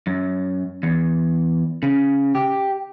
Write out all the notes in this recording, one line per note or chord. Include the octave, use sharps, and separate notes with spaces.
F#2
E2
C#3
G4